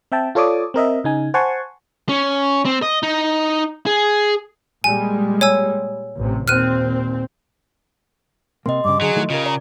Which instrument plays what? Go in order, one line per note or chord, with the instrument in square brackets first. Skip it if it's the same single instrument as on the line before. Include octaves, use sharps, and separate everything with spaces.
[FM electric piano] C4 E5 G5 A5
F4 A4 C#5 D5 D6 D#6
C4 A#4 D#5 E5
C#3 D#4 G#5
C5 F#5 G#5 A5 C6 C#6
[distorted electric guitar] C#4
C4
D#5
D#4
G#4
[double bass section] A#2 G3 G#3 [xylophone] G#5
[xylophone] C#5 G#5 E6
[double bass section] A1 C3
[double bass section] D#2 A#2 C4 [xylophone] F6 F#6 D#7
[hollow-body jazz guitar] C3 A#3 [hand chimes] D#5 C6
[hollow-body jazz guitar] G2 C#3 [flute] D6
[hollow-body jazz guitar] D3 [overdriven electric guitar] F#3 [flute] G#4
[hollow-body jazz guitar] D#3 A3 E4
[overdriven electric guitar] C#3 [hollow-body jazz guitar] F4 G4 A#4 [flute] D#5
[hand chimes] D5 [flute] A#5